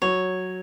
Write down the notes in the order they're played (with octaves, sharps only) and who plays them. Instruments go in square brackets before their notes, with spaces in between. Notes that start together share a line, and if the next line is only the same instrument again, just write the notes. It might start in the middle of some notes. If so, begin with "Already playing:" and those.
[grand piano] F#3 [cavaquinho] C#5